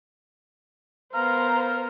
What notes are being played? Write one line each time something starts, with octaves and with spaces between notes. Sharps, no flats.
B3 A#4 C5 F5 A#5